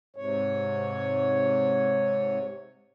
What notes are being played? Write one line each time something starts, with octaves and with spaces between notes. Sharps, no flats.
G#2 C3 C#5